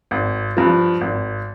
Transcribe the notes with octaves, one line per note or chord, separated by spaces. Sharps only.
G#1
G2 F3
G#1